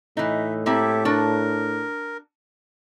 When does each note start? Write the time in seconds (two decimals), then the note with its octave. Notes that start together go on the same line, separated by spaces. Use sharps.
0.17 A2 E3 D#4 E5
0.66 A#3 C4 E4 G4 A4 E5
1.05 D4 F#4 A#4 A5